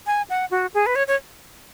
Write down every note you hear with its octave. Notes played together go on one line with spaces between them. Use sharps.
G#5
F#5
F#4
G#4
B4
C#5
C#5